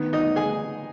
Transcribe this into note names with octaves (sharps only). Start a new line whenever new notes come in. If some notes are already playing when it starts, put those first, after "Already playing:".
Already playing: D#3 B3
D#4 D#5
G#4 G#5